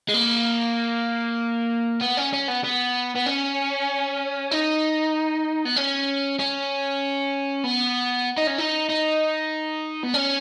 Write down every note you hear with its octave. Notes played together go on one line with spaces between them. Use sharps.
G#3
A#3
B3
C#4
C#4
B3
B3
B3
C#4
D#4
B3
C#4
C#4
B3
D#4
C#4
D#4
D#4
B3
C#4